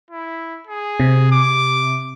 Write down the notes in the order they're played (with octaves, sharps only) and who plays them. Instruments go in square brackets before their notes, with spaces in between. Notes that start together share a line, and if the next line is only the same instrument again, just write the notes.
[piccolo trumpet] E4
G#4
[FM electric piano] C3
[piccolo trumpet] D6